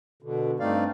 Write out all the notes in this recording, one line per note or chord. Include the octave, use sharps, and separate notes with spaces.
B2 D3
G2 A3 C4 D#4 D5 F5